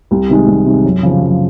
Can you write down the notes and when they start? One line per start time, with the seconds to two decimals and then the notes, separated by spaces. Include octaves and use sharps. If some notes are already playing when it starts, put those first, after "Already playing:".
0.11 C2
0.29 C3 D#3 G#3
0.47 C2
0.66 C3 D#3 G#3
0.84 F#2
1.03 C#3 F3
1.22 F#2